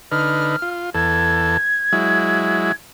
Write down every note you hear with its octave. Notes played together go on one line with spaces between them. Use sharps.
D3 D#4 B4 F6
F4
E2 A4 G#6
F#3 G#3 E4